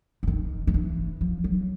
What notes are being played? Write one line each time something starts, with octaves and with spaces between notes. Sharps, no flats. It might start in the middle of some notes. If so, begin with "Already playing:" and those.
E3
D#3
D#3
E3
F3
F#3